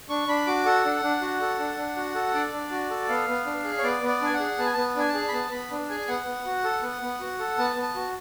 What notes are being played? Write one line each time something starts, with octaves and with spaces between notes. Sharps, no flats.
D4 C#6
D4 B5
F#4 D6
A4 F#5
D4
D4
F#4
A4
D4
D4
F#4
A4
D4 D5
D4
F#4
A4
B3 F5
B3
D4
G#4
C#5
B3 D5
B3
D5
D4 G#5
F#5
G#4
B3 A5
G#5
B3 A5
D4 G#5
A5
G#4
B5
B3 A5
B3 B5
D4
G#4 G#5
B3 F#5
B3
F#4
A4
B3
B3
F#4
A4
B3 A5
B3
A5
F#4